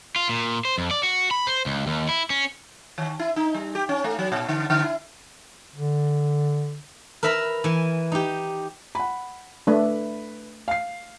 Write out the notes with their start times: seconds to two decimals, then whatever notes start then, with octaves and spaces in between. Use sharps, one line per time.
0.16 F4
0.29 A#2
0.65 C5
0.78 F2
0.91 D5
1.03 F#4
1.31 B5
1.47 C5
1.66 C#2
1.87 D#2
2.09 E4
2.30 C#4
2.98 D#3
3.19 E4
3.36 D#4
3.54 G3
3.75 G4
3.89 C#4
4.04 A3
4.19 F#3
4.32 A#2
4.49 D3
4.70 D3
4.84 E4
5.76 D3
7.23 A#4 B4 E5 A#5 B5
7.64 E3 G#5
8.12 D#4 G4
8.95 F#5 B5
9.67 A3 D4 B4
10.68 F5 C7